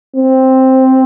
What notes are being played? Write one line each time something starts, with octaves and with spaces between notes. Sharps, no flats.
C4